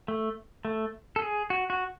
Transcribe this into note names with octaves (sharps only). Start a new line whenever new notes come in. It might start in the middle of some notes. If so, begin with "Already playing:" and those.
A3
A3
A4
G#4
F#4
F#4